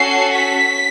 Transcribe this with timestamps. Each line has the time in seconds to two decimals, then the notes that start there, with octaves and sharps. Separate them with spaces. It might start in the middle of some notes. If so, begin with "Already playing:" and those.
Already playing: C#4 F#4 A4 C7
0.34 B6